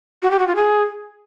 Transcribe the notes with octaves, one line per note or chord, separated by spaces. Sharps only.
F#4
G4
F#4
F4
G#4